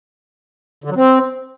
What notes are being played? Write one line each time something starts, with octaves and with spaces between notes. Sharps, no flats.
D3
F#3
C4